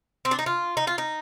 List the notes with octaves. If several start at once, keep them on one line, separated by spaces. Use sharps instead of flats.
C4
D4
D#4
F4
D#4
F4
D#4